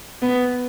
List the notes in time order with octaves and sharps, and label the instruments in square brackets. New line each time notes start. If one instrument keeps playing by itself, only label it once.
[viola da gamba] B3